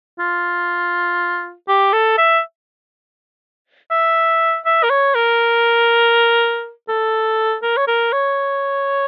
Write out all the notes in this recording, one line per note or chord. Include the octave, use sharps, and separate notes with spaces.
F4
G4
A4
E5
E5
E5
A#4
C#5
A#4
A4
A#4
C#5
A#4
C#5